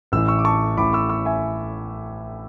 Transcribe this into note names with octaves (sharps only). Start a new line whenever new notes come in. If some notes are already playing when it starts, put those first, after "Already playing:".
A1 A2 E3 E6
C#6 E6
D6
A5 C#6
A1 A2 E3 B5 D6
C#6 E6
C#6 E6
E5 G#5